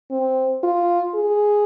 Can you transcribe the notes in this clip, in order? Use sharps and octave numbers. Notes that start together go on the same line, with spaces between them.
C4
F4
G#4